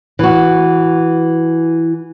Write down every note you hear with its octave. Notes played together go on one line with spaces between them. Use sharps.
E3 F#4